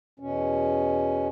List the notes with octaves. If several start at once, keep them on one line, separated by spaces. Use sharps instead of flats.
E2 B2 C#4